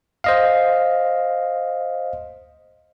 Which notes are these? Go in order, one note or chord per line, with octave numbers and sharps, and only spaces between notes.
C5 D#5 F5